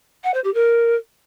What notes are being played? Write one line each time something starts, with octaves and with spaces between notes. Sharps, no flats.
F#5
C5
G4
A#4